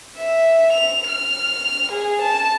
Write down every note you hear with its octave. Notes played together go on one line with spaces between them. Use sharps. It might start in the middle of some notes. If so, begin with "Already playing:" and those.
E5
F7
F6
G#4
A5